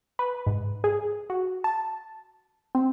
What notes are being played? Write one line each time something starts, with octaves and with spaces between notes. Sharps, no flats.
B4
G#2
G#4
F#4
A5
C4